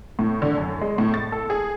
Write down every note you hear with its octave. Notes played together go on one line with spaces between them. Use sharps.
A2
D3
F#2
G#3
A2
A6
A4
G#4